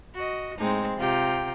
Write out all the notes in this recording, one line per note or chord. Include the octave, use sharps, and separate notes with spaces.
F#4 D#5
A2 G#3 C4 D#4
C3 F4 G4 G5 A#5